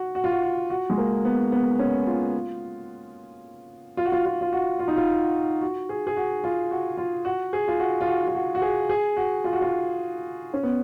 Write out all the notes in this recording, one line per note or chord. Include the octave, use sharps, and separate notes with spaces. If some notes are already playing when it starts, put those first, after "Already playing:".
Already playing: F#4
F#4
F4
F#4
F#4
F#4
G#3
A#3
B3
B3
C#4
F4
F4
F#4
F4
F4
F4
F#4
F4
D#4
F4
F#4
G#4
G#4
F#4
F4
F#4
F4
F#4
G#4
F4
F#4
F4
F#4
F4
F#4
F#4
G#4
G#4
F#4
F4
F#4
F4
C#4
B3